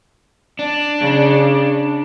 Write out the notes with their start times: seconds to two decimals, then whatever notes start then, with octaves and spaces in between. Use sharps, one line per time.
0.59 D4
1.00 C#3